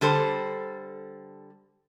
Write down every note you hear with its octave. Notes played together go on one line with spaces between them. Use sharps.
D3 G3 A4 C5